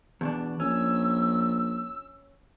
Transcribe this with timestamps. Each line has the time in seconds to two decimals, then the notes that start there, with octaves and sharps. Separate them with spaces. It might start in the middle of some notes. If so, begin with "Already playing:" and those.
0.21 E2 B2 D4
0.60 A#1 C#4 E6